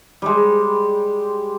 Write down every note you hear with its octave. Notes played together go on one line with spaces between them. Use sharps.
G3 G#3